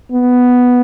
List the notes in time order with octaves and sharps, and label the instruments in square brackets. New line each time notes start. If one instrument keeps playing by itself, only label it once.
[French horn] B3